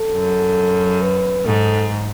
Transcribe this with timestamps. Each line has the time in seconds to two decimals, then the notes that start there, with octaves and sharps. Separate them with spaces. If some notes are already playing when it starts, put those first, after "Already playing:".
Already playing: A4
0.12 F#2
1.02 B4
1.46 G#2 A4